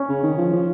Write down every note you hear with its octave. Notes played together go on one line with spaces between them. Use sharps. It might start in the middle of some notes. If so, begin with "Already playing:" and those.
Already playing: C#4
C#3
D#3
F3
F3